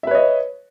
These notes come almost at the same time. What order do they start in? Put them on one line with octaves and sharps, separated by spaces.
E5 B4 C#5 D#5